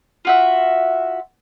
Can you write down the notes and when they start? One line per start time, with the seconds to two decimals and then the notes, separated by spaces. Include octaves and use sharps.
0.25 F4 F#4 E5